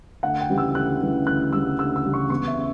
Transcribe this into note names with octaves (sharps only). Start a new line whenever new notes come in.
D2 F#5
G5
C#3 E3 G3
E6
D2 F#6
C#3 E3 G3
D2 F#6
C#3 E3 G3 E6
D2 E6
E6
C#3 E3 G3
C#6
E2 C#6
E5
C#3